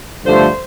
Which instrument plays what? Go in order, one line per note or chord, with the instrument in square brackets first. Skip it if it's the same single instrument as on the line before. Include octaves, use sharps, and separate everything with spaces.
[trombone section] G2 D3 F3 A3 [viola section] C5